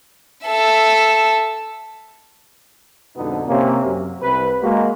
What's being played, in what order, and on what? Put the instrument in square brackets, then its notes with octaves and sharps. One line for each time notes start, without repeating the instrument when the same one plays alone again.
[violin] A4 E5
[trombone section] F2 G#2 B2 D3 B3 D#4
C3 A#3 C#4
F#2
C2 B4
G#3 A#3 F#4